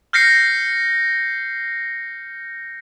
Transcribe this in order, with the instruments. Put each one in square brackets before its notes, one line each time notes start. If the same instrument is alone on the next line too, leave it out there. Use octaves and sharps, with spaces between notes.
[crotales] F6 G6 A#6 C7 C#7